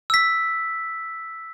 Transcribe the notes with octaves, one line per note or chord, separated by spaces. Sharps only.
E6 B6